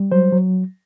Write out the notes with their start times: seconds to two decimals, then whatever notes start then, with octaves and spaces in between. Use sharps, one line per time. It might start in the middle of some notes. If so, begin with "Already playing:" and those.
Already playing: G3
0.12 F#3 C5
0.33 F#3